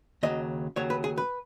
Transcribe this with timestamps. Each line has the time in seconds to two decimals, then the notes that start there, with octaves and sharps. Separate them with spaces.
0.23 D#2 C#3 F#3 D#5
0.76 D#2 C#3 F#3 C#5
0.90 B4
1.04 G#4
1.18 B4